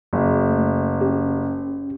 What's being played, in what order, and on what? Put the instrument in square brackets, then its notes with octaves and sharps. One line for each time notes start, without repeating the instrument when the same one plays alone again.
[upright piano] F#1
[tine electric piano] A3
C#4 G4